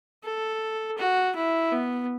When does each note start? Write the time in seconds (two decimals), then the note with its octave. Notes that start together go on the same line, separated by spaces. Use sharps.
0.24 A4
0.98 F#4
1.35 E4
1.72 B3